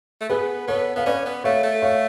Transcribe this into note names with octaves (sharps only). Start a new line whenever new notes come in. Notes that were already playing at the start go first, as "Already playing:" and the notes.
A3
B3 G#4 B4
B3 A4 C#5
B3 F5
C#4 B4 D5
B3
A3 C#5 F5
A3
C#5 F5